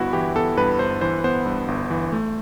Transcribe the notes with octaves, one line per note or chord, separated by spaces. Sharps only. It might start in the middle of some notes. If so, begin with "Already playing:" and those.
Already playing: G1 G2 B3 E4 F#4
E3 G4
B3 A4
G2 B4
G1 C5
E3 C5
B3 C5
G2
G1
E3
A3